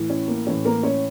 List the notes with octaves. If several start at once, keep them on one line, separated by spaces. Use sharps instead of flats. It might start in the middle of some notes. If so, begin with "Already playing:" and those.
Already playing: A2 E3
C#4
A#3
A2 E3 C#4
A#3 A#4
C#4 C#5